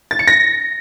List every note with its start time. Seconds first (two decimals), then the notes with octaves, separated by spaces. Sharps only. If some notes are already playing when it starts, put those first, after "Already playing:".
0.11 A6
0.19 C#7
0.28 A#6